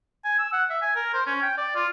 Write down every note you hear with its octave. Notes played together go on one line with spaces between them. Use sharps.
G#5
E6
F#5
E5
G#5
A#4
C5
C#4
G5
D5
F4